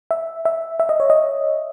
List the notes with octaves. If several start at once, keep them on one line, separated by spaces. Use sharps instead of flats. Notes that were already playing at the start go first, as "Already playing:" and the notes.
E5
E5
E5
D#5
C#5
D#5